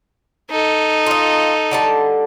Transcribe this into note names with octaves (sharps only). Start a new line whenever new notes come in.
D#4 A4
F4 D#5
D3 G3 A5